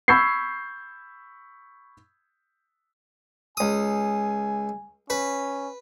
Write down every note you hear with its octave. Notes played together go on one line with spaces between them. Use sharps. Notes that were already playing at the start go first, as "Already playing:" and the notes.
B5 C#6 E6 G6 G#6 C7
C#2 G#5 D#6
C#4 B4